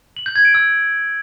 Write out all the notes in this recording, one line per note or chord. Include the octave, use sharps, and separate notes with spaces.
F#7
G6
G#6
D7
E6